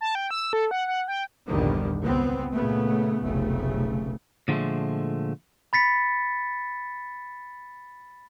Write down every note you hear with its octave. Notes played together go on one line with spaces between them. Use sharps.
A5
G5
E6
A4
F#5
F#5
G5
A#1 E2 G2 D3 D#3 G3
C#2 B3 C4
A#2 C#3 A3 B3
F1 B1 C#3 A3
A#2 D3 F3 F#3 G#3 A3
B5 A6 B6 C#7